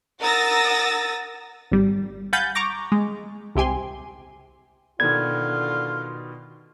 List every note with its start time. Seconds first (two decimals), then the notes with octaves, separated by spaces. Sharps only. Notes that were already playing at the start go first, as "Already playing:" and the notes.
0.21 A#4 F#5 D#6 E6 A6 A#6
1.71 G#1 G3
2.33 F5 F#5 G#5 B5 G6 A6
2.55 A#5 C#6 D6 A#6
2.92 G#3
3.55 C2 C3 G4 G#5 C6
5.00 B2 D3 D#3 B3 F4 G#6